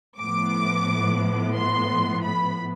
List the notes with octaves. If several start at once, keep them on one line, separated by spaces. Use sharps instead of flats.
A2 F3 B3 D6
C6
B5